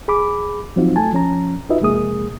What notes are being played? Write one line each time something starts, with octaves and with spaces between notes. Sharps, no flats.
G#4 B5 D6
F3 F#3 C4 D#4 F4 F#4
A3 G#5 A5
F3 C#4 A#5
D#4 F4 F#4 B4 D#5 E5
F2 C3 G#3 A#3 G#4 D#6